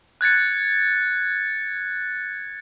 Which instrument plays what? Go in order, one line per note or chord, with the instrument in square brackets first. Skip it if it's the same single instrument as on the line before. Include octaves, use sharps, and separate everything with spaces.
[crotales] F#6 G#6 A6 C#7